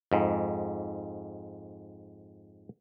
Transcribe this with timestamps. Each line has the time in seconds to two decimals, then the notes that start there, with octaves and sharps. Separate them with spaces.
0.12 F2 G#2